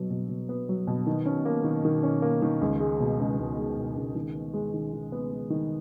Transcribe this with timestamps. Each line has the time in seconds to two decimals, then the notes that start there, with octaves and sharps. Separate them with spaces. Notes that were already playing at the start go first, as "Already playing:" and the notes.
Already playing: B2 F#3 B3
0.10 B2
0.29 B2
0.49 B3
0.69 F#3
0.87 B2
1.06 D#3
1.26 C#4
1.45 A#3
1.64 D#3
1.85 D#3
2.03 C#4
2.22 A#3
2.42 D#3
2.61 C#2
2.80 G#3
3.00 B2
3.20 C#2
3.39 C#2
3.58 G#3
3.77 B2
3.96 C#2
4.15 D#3
4.35 B3
4.54 G#3
4.74 D#3
4.93 D#3
5.12 B3
5.32 G#3
5.50 D#3